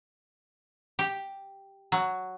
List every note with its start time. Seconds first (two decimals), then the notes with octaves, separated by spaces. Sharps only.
0.99 G4
1.92 F#3